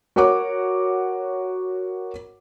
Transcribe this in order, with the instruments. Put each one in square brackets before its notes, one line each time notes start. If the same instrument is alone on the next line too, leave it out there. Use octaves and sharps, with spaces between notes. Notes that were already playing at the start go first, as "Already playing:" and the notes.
[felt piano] F#4 A#4 C#5 F#5 D6